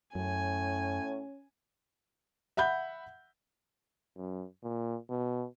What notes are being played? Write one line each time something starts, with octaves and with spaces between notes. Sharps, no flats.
F#2 A2 C#4 G#5
E5 F#5 B5 G6
F#2
A#2
B2